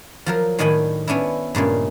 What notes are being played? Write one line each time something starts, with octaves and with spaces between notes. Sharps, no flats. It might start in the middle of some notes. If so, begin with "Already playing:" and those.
F3 F#3 A#4
A2 D#3 D4 D#5 G#5 B5
B3 C#4 D4 E4
G2 A#2 C#3 G#3